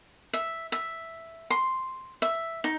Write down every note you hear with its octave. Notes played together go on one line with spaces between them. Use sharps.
E5
E5
C6
E5
D#4